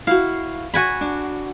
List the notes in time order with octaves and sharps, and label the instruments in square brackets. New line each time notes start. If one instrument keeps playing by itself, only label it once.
[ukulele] E4 F#4 [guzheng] F5
[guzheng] F#4 G#5 B5
[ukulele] D4